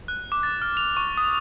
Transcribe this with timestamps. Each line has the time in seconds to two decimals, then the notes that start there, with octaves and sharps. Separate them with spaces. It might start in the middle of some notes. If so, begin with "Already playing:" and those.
0.08 F#6
0.32 D6
0.43 A6
0.62 F6
0.77 F7
0.97 C#6
1.17 D#6